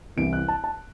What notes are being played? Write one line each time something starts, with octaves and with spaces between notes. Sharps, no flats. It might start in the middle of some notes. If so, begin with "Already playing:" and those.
C2 C3 E3 D7
F#6
A5
A5